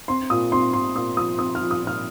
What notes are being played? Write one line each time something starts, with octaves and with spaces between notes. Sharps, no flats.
C4 C6
A#2 D#6
C4 C6
A#2 C6
A#2 D#6
F3 D#6
C4 D#6
F6
F3
D#6
A#2
F6